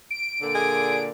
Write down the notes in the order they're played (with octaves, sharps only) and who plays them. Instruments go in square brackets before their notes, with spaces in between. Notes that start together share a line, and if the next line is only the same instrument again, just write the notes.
[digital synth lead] D7
[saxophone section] A#2 D3
[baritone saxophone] G#4